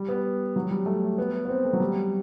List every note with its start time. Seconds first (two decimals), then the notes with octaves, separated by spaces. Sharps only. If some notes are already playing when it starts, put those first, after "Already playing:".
Already playing: G3
0.09 B3
0.56 F#3
0.71 G3
0.86 A3
1.18 B3
1.45 B3
1.49 C4
1.65 A3
1.73 F#3
1.80 G3